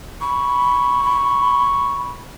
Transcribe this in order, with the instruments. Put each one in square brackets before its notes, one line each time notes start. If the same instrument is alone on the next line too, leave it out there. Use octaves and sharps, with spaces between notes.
[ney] B5 [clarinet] C#6